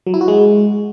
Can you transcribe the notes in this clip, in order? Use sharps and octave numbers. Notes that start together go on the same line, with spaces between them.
F#3
E4
F#4
G#3